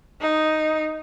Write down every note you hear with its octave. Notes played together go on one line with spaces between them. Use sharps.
D#4